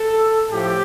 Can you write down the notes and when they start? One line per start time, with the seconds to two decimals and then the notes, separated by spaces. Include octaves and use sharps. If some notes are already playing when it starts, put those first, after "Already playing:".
Already playing: A4
0.51 A2 F3 G4